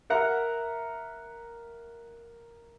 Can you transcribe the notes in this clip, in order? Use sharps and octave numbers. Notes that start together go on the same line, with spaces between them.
A#4 E5 F#5 A#5